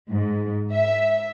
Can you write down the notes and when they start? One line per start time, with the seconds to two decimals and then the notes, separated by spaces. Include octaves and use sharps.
0.10 G#2
0.73 E5